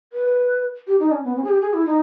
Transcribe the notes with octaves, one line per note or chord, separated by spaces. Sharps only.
B4
G4
D#4
C#4
B3
C#4
G#4
G4
G#4
E4
D#4